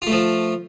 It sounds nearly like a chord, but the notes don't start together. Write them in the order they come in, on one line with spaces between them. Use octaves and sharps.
F4 A3 F3